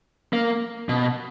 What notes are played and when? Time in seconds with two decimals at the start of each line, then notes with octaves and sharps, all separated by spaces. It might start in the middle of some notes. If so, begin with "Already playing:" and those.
0.33 A#3
0.89 B2